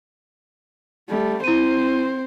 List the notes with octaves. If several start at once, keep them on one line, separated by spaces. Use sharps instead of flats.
G3 A3
C4 E4 C5 D#7